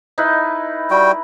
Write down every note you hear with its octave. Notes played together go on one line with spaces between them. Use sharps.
D#4 E4 B4
G3 F#4 G5